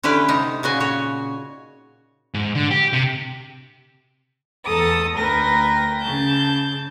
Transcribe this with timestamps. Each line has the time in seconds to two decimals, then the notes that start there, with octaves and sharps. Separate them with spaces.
0.03 D3 C#4 E4 G4 B4
0.28 C3 D#4
0.63 A#2 C#3 F#4 G#5
0.80 F#4 C#5
2.34 G#2
2.55 D3
2.71 G4
2.93 C3
4.66 E2 A4 A5 A#5 D#6
5.17 D2 A#4 B4 G5 A#6
6.00 C#3 A5 G6